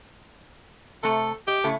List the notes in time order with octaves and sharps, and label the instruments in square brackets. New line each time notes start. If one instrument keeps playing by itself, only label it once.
[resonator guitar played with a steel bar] C3 A3 [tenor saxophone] A4
[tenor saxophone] G4 [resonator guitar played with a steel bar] D#5
[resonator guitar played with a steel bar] A2 C#3 A3